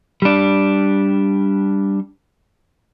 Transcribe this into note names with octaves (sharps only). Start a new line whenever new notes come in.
G3 D4